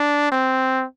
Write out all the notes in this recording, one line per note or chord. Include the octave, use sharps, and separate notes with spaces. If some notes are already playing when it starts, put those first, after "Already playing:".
Already playing: D4
C4